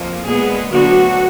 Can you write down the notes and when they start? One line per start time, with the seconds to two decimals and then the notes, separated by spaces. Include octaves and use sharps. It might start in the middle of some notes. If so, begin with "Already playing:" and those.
Already playing: F2 F3 A#3
0.25 A#2 G#3 B3 G#4
0.71 D2 D3 F#3 B3 F#4